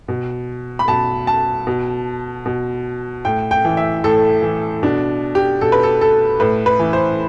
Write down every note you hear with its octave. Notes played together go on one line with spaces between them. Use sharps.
B2
B5
B2 A5
A5
B2
B2
A2 G5
G5
E3
E5
A2 A4
E3
B2 D4
G4
B2 A4
B4
A4
A4
A2 B4
B4
E3
C5